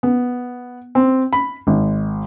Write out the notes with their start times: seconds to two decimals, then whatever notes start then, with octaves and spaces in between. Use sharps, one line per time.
0.03 B3
0.95 C4
1.33 B5
1.67 G#1